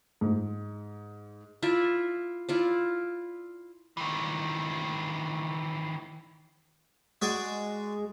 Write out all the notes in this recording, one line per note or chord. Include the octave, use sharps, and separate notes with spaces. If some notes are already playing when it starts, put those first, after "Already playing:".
G#2
E4 F4 D5 E5
E4 F4 D5
D#3 E3
G#3 F#4 G#4 D5